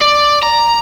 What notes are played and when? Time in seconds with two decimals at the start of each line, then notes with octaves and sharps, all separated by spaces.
0.01 D5
0.43 A#5